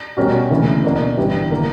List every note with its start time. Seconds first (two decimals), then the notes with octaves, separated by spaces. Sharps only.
0.17 B2 G3 C#4 F#4 A#4
0.50 D2 C#3 E3 A#3
0.84 B2 A#3 D4
1.17 G1 G2 E3 G3
1.51 D3 A#3